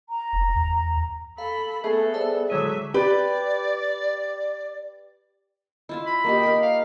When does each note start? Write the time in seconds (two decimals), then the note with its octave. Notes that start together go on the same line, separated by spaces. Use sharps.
0.09 A#5
0.33 F1
0.55 E2
1.38 A4 F5 B5
1.84 A3 B3 G#4 A4
2.14 G3 C5 E5 A5
2.50 A2 D3 F#3 G#3 E5 D#7
2.94 G4 B4 D5
5.89 E4 F4 E5
6.07 B5
6.24 A#3 D#4 G4
6.43 A#4 G5
6.62 F5